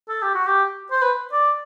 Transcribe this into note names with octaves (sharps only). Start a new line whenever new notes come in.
A4
G4
F#4
G4
C5
B4
D5